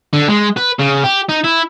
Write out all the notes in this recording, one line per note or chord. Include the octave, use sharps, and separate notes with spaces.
D3
G#3
B4
C#3
G4
D#4
E4